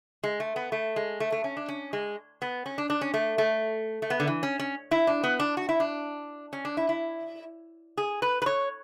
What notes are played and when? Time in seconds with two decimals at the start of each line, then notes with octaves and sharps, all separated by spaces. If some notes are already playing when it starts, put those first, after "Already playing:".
0.24 G#3
0.40 A3
0.56 B3
0.72 A3
0.96 G#3
1.20 A3
1.32 A3
1.44 C#4
1.57 D4
1.68 C#4
1.93 G#3
2.42 B3
2.66 C#4
2.78 D4
2.90 D4
3.01 C#4
3.14 A3
3.38 A3
4.02 A3
4.10 B3
4.20 D3
4.27 E3
4.43 C#4
4.60 C#4
4.91 E4
5.07 D4
5.23 B3
5.40 D4
5.57 F#4
5.69 E4
5.80 D4
6.53 C#4
6.65 D4
6.77 E4
6.89 E4
7.97 G#4
8.22 B4
8.42 B4
8.46 C#5